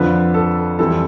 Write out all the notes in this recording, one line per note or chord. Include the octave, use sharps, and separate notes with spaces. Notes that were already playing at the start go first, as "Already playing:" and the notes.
Already playing: F2 D3 F3 B4
A4
F2 E3 G3 C4 A4